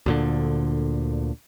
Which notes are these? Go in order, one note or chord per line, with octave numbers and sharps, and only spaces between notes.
D2 A#2 D3